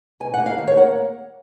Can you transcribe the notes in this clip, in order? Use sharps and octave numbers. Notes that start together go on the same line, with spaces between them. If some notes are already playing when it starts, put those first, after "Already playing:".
B2 G#5
F#5
A#3
F5
D#3
C#5
A#3 F#5